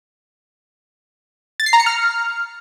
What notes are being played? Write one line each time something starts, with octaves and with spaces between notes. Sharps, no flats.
A6
C7
A#5
C#7
F6